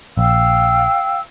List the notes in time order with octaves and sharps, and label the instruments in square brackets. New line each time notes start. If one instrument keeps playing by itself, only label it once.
[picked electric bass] A#1 [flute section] F5 G5 E6